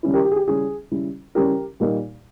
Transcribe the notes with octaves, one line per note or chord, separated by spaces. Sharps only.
C#3 G3 C#4 E4
G4 A#4
G4
G#4
G4
C#3 G3 C#4 E4 G#4
C#3 G3 C#4 E4
C#3 G3 C#4 E4 G4 A#4
A#2 G3 A#3 D#4